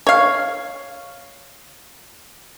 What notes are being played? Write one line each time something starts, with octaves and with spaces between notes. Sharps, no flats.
C#5 F5